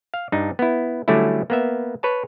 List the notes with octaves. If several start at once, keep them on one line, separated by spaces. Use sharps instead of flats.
F5
G2 D4 D#4
B3 E4
D3 F#3 G3 A3 C#4 E4
A#3 B3 E5
B4 C#5 A5